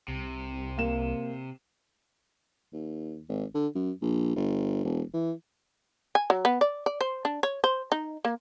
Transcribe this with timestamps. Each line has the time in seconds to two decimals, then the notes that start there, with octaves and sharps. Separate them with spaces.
0.08 C2 C3
0.78 A#3 E7
2.73 D#2
3.29 G#1
3.55 D3
3.75 F#2
4.02 A#1
4.36 G1
4.84 E1
5.14 E3
6.15 G#5
6.30 F#3
6.45 B3
6.61 D5
6.86 D5
7.01 C5
7.25 D4
7.43 C#5
7.64 C5
7.92 D#4
8.25 A#3